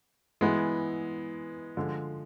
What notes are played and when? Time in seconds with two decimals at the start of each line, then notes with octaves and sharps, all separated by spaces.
0.41 E3 G#3 B3 E4
1.77 D3 F3 G#3